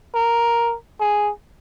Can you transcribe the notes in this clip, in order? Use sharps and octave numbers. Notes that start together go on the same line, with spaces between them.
A#4
G#4